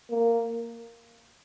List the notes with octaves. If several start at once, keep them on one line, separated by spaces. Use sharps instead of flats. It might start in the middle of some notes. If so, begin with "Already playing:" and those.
A#3